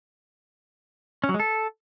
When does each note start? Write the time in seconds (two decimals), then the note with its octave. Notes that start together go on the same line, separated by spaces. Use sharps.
1.24 C#4
1.29 F#3
1.34 G#3
1.40 A4